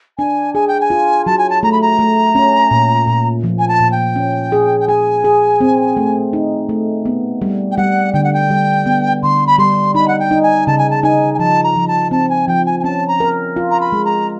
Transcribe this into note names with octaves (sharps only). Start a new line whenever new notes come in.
D4 G#5
G#4 G#5
G5
G#5
F4
F#3 A5
G#5
A5
A3 A#5
B5
A#5
A3
C#4
A#2
A#2
F3
G#5
A5
A#2
G5
C#4
G#4
G5
G#4 G#5
G#4
C4
A3
D#4
A3
B3
G3
G5
G3 F#5
D3 G5
F#5
G5
G3
B3
D3 C6
B5
G3 C6
D#4 B5
F#5
G5
D#4
G#5
C#3 A5
G#5
A5
D#4 G#5
G#5
F3 A5
A#5
F3
A5
C4 A5
G#5
F3 G5
G#5
G#5
C#4 A5
A#5
A#4
F4
A#5
B5
G#3
A#5